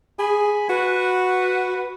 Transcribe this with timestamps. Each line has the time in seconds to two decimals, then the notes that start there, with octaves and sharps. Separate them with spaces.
0.19 G#4 G#5 B5
0.70 F#4 B4